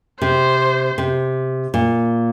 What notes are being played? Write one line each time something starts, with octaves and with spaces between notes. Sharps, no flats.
C3 C5
C3
A#2